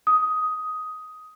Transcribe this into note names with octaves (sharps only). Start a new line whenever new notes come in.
D#6